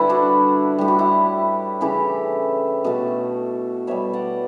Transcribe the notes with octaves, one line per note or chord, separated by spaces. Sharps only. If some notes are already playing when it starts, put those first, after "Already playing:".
Already playing: D3 G3 E4 A4 B4
D4 F#4
A2 G3 G4
F#4
E4 G4
C#3 E3 A3 E4 G4
B2 A3 F#4 A4
B2 G3 C#5 E5
D5 F#5